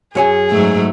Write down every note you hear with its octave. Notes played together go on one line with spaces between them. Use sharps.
F#2 G#4 C#5 G#5
G#2 F#3 A3